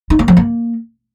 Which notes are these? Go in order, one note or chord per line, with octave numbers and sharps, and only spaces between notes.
D#4
A#3
F3
A#3